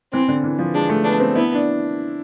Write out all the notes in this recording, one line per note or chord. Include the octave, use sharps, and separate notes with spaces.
E3 C4
D3
E3
F3
G#3 D4
A3
B3 D4
C4
B3 E4
D4